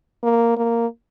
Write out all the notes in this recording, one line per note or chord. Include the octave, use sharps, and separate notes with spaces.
A#3
A#3